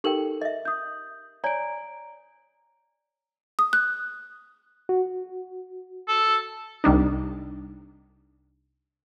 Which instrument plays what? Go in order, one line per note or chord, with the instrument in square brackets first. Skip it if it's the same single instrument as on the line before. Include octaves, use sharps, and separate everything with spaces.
[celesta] D#4 A4 F#7 [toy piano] G4 A#4 G5
[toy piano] D#5 E5
[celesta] D#6 G6
[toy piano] C#5 D5 G#5 [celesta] A#5 D7
[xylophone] D#6
F#6
[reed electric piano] F#4
[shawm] A4
[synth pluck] C2 G3 D4 D#4